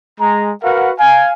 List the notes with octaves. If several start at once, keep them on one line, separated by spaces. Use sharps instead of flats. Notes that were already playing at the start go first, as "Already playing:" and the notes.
G#3 A#5
F#4 A#4 B4 F5 F#5
F5 G#5